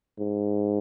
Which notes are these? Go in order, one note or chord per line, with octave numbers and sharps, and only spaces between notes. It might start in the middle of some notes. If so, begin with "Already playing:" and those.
G#2